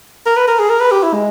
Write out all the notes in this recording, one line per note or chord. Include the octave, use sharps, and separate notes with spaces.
A#4
B4
A#4
G#4
A#4
B4
G4
E4
G#3